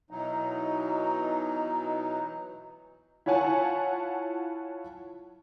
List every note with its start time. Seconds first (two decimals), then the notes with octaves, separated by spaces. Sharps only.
0.11 B2 E3 F#3 D#4
3.26 E4 F4 C#5 F#5 G#5 A5